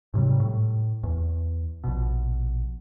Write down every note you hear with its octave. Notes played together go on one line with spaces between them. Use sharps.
G#2 C3 F#3 G3
A2
E2
A#1 B2